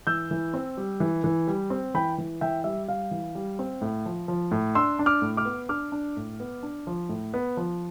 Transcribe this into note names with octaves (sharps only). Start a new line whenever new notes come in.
E3 E6 G6
E3
C4
G3
E3
E3
G3
C4
E3 G5 B5
E3
E3 E5 G5
G3 E5
G3 F5
E3
G3
C4
A2
F3
F3
A2
D4 C6 E6
D4
D6 F6
A2
D6 F6
B3
D4 D6 F6
D4
A2
B3
D4
F3
A2
B3
F3